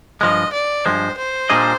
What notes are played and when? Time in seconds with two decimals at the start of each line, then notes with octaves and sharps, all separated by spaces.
0.21 G2 F3 G#3 D#5
0.53 D5
0.85 G2 F3 G#3 C5
1.17 C5
1.50 A#2 G3 D4 G#4 D#5